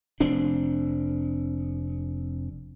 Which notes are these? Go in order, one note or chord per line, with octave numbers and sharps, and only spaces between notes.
F1 C4 D4